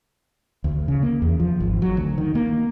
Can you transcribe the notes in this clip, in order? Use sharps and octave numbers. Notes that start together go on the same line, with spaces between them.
D2
C#3
A#3
E2
F3
G#1
F#3
D2
D#3
A#3